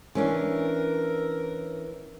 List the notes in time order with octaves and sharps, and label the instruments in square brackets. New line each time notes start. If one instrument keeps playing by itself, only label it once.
[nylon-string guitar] E3 C#4 D4 [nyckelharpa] A#4